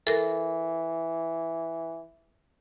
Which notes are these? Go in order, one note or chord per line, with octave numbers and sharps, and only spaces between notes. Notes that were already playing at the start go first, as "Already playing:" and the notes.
E3 A4 A#4